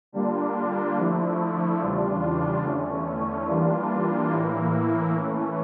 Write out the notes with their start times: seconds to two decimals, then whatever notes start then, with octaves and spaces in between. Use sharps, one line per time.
0.12 D3 G3 A#3 D4 F4
0.95 D3 F3 A3 E4
1.79 E2 C#3 G3 D4 F4
2.63 E2 D3 A3 C#4
3.46 E3 G3 A#3 D4 F4
4.30 A2 E3 A#3 E4
5.14 E3 A3 C#4